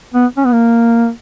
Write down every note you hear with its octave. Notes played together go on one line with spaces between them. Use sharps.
B3
C#4
B3
A#3